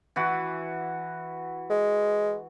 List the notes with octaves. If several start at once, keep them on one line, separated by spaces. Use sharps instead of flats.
E3 F#4
G#3